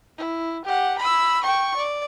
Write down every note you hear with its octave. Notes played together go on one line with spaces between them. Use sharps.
E4
G4 F#5
B5 E6
G5 C#6
D5